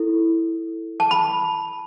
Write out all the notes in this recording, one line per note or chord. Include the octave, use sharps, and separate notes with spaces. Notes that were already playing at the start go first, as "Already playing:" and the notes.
Already playing: E4 A4
A5
B5